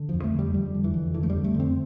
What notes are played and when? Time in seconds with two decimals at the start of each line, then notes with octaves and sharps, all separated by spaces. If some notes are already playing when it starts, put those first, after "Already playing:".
Already playing: D3
0.09 F2 F3
0.24 A3
0.34 D3 G3
0.54 F2 G3
0.75 D3
0.84 E3
0.94 F2
1.14 D3 E3
1.23 A3
1.30 G3
1.35 F2
1.44 A3
1.54 D3
1.60 C4